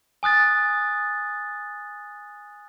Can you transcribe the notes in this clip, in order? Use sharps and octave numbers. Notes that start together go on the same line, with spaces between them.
G#5 D#6 F#6 A6